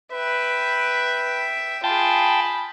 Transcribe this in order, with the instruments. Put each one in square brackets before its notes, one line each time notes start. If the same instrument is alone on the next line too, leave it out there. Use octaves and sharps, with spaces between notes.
[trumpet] B4 [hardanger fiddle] E5 G5
[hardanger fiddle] F4 G#4 [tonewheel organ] G5 A5 [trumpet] B5